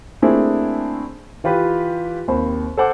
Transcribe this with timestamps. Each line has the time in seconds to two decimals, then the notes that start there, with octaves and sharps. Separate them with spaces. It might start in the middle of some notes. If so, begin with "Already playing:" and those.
0.22 A3 A#3 C4 D4 E4 G#4
1.44 E3 F4 G4 B4
2.28 D#2 C4 C5 B5
2.78 A4 C5 F#5 D6